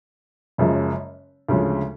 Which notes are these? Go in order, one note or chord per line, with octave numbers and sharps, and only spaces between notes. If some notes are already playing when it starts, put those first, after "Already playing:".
F#1 F#2 C#3 F3 G#3
D2 C#3 F3 G#3